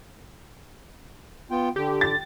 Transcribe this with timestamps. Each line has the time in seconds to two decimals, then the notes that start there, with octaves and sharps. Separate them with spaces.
1.51 B3 F4 G5
1.76 D3 G4
2.01 A6